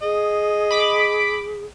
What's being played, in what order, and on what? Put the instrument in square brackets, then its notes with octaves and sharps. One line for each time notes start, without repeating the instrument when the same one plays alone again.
[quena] G#4 [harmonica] D#5
[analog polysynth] B5 D6